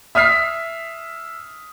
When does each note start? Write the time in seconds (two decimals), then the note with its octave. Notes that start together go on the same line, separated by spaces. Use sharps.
0.15 E5 D#6 F6 B6 C7